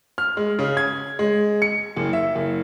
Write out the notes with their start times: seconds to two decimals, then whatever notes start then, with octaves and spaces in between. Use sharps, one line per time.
0.18 F6
0.37 G#3
0.59 C#3
0.77 G#6
1.19 G#3
1.62 C#7
1.96 F#1
2.13 E5
2.35 F#1